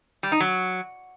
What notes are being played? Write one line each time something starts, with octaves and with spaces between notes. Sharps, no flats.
G3
D#4
F#3